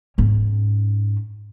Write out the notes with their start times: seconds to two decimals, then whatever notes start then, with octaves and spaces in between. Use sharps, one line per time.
0.18 G#2 C#4